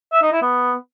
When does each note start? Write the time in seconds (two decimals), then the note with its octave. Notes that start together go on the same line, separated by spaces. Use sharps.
0.13 E5
0.22 D#4
0.32 E4
0.42 B3